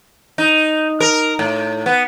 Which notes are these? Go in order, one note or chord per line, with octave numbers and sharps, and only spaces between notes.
D#4
A#4
A2
B3